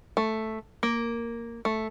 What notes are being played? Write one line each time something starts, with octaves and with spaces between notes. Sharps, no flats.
A3
A#3
A3